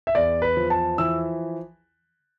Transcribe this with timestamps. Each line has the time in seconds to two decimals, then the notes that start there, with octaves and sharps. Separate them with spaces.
0.07 E5
0.15 E2 D5
0.42 B4
0.57 F3
0.70 A5
0.98 E3 E6